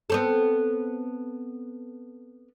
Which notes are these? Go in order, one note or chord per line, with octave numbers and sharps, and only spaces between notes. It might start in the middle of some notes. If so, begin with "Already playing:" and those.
B3 C4 A4